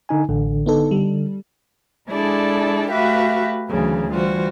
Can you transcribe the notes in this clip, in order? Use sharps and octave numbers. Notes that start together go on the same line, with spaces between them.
D3 D#4 G#5
A1 D3
B3 D#4 A4
G3
G#3 D4 E4 G#4 A4 D5
A3 F#4 G4 B4 E5 F5
D2 C#3 E3 F#3
E3 G3 F4 F#4 C5